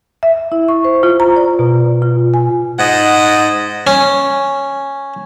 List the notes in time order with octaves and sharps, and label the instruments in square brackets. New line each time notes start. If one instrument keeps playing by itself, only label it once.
[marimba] E5
E4
C#6
C5
F4
A#5
D5
B2
F4
G#5
[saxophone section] G#2 D#5 F#5
[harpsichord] C#4